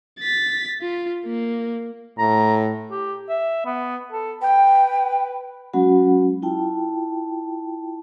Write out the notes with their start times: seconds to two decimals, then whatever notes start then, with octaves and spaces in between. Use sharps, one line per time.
0.19 A6 B6
0.81 F4
1.26 A#3
2.18 A2 A#5
2.91 G4
3.29 E5
3.65 B3
4.12 A4
4.42 B4 G5
5.73 F#3 G#3 C#4 F#4 F#5 B5
6.42 E4 F4 G5 A5